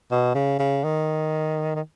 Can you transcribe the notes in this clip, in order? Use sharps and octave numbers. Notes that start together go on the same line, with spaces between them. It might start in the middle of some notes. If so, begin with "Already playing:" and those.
B2
C#3
C#3
D#3
D#3